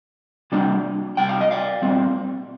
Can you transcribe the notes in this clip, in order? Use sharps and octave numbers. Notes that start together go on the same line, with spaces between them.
C3 G3 A#3 D4
C3 G3 G5
F5
D#5
D5 F5
A#2 G3 C4